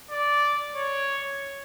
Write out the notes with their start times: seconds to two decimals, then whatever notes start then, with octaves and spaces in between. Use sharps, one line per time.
0.11 D5
0.76 C#5